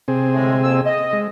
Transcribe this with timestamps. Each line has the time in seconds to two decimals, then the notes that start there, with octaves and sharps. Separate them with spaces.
0.08 C3 C4 G#4
0.33 A2 D3 G#3
0.63 F2 A#3 E6
0.85 D#5
1.13 G#3